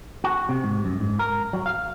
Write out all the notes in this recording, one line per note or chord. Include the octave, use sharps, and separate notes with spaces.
F#4
C3
G#2
F#2
G#2
A#4
F#3
F5